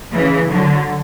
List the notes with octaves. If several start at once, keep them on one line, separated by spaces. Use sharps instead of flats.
C#3 E3
D3 F#3